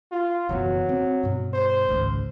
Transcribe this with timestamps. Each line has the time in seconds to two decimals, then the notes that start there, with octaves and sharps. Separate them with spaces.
0.12 F4
0.49 F#1 E2 B2 F#3
0.89 C4
1.23 G2 B2
1.54 C5
1.89 G#1 C#2